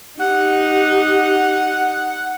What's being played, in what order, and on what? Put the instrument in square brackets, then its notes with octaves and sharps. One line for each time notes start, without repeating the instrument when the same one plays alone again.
[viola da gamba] D#4 [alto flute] G4 [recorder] F#5